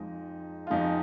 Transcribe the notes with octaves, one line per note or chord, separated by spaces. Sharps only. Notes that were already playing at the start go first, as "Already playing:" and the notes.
Already playing: F2 F3 G#3 D#4
F4
F2 F3 G#3 D#4